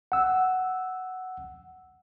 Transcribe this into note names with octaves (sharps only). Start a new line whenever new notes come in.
F#5 E6